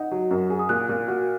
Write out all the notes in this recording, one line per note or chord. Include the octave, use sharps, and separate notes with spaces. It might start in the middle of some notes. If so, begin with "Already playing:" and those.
Already playing: D#4 F#5
F#3
F#2
G#4
D#6
A#2 F#6
A#2
F#4